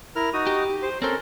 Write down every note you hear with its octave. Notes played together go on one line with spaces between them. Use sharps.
E4 A#4 F6
D#4 F#4 D#6
G4
C5
C4 C#4 A4 A#4 C5